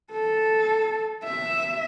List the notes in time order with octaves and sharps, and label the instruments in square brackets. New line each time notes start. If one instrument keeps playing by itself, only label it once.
[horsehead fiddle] A4
E5